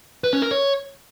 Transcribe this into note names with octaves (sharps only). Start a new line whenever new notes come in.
B4
C#4
A#4
C#5